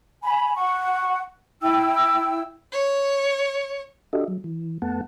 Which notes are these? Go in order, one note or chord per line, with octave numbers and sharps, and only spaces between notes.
G#5 B5
F#5 C#6
E4 G5 E6
C#5
D4 F#4 G4 A4 D#5 E5
F#3
E3
F2 A3 B3 F#5 A5